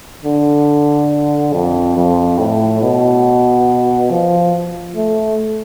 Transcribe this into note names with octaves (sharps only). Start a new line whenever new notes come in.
D3
F2
F2
A2
B2
F3
A3